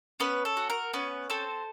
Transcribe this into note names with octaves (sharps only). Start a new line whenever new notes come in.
B3 C#4 B4
A4
F#4
A#4
B3 C#4 B4
C4 A4 C5